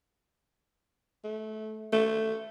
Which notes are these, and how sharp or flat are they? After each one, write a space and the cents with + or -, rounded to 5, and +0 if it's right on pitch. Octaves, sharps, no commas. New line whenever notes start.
A3 -20
A3 +5